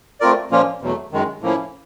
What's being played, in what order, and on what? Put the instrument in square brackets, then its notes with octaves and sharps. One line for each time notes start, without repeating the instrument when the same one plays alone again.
[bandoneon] A3 C4 F4 A#4 D5
A#2 F3 A#3 C#4 F4
E2 B2 F#3 A3
F#2 D#3 G#3
A2 F3 A#3 C#4 E4